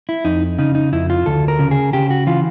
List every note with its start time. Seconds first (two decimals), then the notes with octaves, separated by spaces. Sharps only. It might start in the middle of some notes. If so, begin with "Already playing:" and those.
0.09 E4
0.25 F2 D#4
0.58 C#3 D#4
0.75 D#4
0.93 F2 E4
1.10 F4
1.26 D2 A4
1.48 A#4
1.59 C#3
1.71 G#4
1.93 C#3 G4
2.10 F#4
2.27 E3 F4